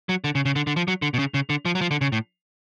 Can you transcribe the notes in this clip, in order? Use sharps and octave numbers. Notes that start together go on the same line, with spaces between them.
F#3
D3
C#3
C#3
D3
D3
F3
F#3
D3
B2
C#3
C#3
D3
F3
F#3
F3
D3
C#3
A2